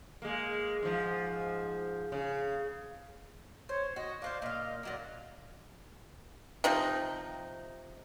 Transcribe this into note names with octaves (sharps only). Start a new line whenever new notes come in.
G#3 A#3
G#2 F3
C#3
C5 C#5
F#4 D#5
D4 B4 C5 F5
A#2 D#5 F5
A#2 F#3 A#3 D#5
C3 F3 D#4